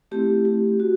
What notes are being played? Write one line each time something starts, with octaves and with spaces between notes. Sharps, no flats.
A3 C4 E4 G4
G4
F#4